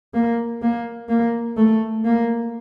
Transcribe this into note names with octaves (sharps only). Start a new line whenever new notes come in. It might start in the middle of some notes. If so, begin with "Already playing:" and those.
A#3
A#3
A#3
A3
A#3